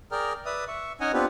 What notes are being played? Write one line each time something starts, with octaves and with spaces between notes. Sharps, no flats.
G#4 A#4 D5 G5 A#5 F6
B4 D5 E5 D#6
E5 C#6
C#4 D#4 C#5 D#5 F#5 G#5
B3 C4 D4 F4 G4 B4